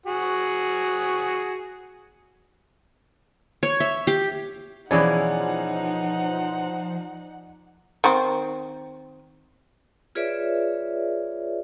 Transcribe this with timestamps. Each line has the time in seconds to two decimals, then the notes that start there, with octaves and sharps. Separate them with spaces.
0.06 F#4 G#4
3.63 C#5
3.80 E5
4.07 G4
4.91 B2 E3 F3 C#4 D#4 G#4 D5 F#5
8.04 D#3 C4
10.15 F4 G#4 B4 C#5 D5 E5